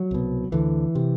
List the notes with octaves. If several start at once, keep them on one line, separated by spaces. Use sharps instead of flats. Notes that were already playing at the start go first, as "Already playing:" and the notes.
Already playing: F#3
C2 B2
D2 D3 E3
C3